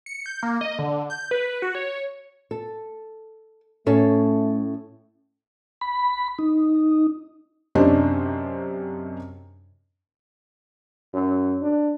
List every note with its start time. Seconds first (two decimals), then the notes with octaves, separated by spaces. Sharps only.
0.06 C#7
0.26 G6
0.43 A#3
0.61 D#5
0.79 D3
1.10 G6
1.31 B4
1.62 F#4
1.75 C#5
2.51 A4
3.86 A2 A3 C#4 A4
5.81 B5
6.39 D#4
7.75 F#2 C3 C#4 D4 C5 D#5
11.13 F#2
11.62 D4